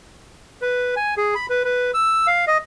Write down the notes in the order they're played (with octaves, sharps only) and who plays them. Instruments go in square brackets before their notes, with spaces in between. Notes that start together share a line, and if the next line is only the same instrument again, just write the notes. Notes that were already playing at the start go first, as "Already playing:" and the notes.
[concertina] B4
G#5
G#4
B5
B4
B4
E6
F5
D#5